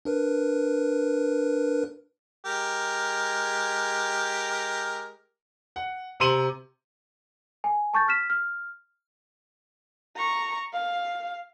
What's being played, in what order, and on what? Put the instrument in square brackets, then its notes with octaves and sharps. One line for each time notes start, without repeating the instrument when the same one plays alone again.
[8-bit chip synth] D4 A#4 B4
[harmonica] G#3 G4 A#4
[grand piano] F#5
C3 A#5 C6 D#7 F#7
[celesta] G#5
A5 C#6 G6 A6
F6 B6 E7
F6
[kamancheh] A#5 C#6
F5